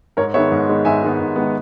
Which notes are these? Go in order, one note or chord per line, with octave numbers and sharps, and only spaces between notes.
G#2 A#4 C#5
D#3 G#3 B3 C#5 E5
G#2
D#3 G#3 B3
G#2 E5 G#5
D#3 G#3 B3
G#2
D#3 G#3 B3